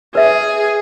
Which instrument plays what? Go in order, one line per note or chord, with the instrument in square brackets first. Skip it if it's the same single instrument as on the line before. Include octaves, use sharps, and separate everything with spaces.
[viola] G#4 [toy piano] B4 E5